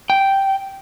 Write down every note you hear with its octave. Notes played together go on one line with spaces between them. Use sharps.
G5